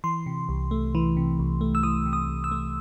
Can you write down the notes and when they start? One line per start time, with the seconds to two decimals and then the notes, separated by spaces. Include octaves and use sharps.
0.04 E3 C6
0.26 C3
0.49 C2
0.71 A3
0.95 E3
1.17 C3
1.39 C2
1.61 A3
1.75 E6
1.83 E3 D#6
2.06 C3
2.13 D#6
2.28 C2
2.44 E6
2.51 A3